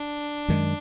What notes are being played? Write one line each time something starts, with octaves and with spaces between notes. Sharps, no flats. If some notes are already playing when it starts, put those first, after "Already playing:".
Already playing: D4
F#2 D#3 G#3